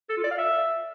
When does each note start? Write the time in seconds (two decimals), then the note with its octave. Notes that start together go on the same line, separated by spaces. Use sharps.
0.10 A4
0.17 F4
0.24 D5
0.31 F5
0.38 E5